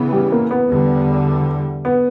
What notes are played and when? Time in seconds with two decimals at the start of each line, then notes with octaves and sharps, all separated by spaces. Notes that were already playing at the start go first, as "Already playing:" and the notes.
Already playing: C#3 E3 B3
0.13 G3
0.32 A#3
0.51 B3
0.70 E2 D3 G3
1.85 B3